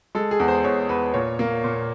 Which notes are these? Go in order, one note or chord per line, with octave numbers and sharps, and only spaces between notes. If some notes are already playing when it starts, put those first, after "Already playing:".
G#3 A4
G#4
E2
C5
E2 C#5
E2 B4
A#2 C#5
A#3
A#2